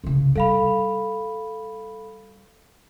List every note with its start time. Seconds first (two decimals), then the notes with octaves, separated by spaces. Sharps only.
0.04 C2 C#3
0.35 G3 A4 F5 B5